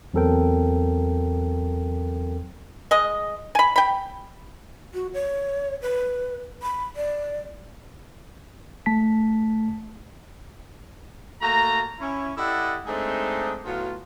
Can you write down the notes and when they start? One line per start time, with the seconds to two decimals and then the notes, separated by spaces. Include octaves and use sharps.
0.14 E2 F#3 C4 A4 A#4 G5
2.91 G#3 D#5
3.55 G#5 B5
3.76 G5 B5
4.94 F#4
5.14 C#5
5.82 B4
6.63 B5
6.96 D5
8.86 A3 A5 B6
11.42 A3 A#3 F#4 A5 A#5
11.99 C#4 E4
12.37 E4 G4 A4 D5 D#5 F#5
12.85 G#3 A3 C4 D4 D#4
13.65 A2 F#3 B3 F4